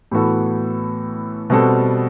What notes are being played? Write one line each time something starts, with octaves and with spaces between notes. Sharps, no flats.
A2 E3 B3 F#4 A4
B2 G3 C4 F#4 A4